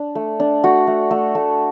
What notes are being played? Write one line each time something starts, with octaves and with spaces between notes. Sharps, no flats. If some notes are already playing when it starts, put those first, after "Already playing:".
Already playing: D4
A3
D4
A3 F#4
A3
A3
A3